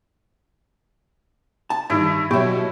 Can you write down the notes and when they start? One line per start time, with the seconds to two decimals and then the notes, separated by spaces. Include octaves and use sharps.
1.70 A5
1.90 G2 D#3 E4 D#5
2.31 B2 F#3 G4 E5 C#6